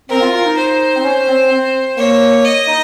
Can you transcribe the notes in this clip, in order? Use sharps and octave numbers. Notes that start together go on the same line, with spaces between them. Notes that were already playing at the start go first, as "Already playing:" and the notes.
C4 A#4
F4
F4
D#4
C5
C4
C#4
C4
C4
A#3 C#5
D#5
D#4